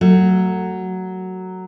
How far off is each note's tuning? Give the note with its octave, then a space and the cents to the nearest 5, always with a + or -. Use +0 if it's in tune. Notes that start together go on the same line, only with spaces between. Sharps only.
F#3 +5 A3 +30